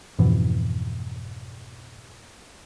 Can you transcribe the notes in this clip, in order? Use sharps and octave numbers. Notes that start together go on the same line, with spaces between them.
F2 G#2 B2 E3